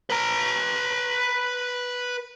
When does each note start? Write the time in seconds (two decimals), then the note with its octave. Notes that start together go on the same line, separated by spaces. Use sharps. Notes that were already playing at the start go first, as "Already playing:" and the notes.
0.10 B4 A#5